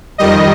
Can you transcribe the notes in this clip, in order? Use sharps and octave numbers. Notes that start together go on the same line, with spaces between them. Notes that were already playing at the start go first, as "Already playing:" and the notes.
F2 D#3 G3 D#5